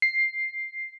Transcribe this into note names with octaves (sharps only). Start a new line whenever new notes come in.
C7